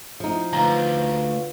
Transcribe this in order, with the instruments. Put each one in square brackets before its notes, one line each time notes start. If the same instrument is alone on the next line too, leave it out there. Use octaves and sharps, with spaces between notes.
[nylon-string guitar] F3 D#4
[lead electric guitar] D2 [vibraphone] F4 B4 F5 [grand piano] A#5